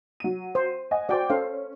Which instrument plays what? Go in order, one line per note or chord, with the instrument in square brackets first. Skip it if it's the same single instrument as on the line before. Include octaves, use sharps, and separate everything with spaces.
[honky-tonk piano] F#3 D#7
[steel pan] C5
[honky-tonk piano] D#5 F#5 G#5
[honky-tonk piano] F#4 G5 D6 [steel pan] C5 D5
[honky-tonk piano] C#4 [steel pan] A4 C5 F5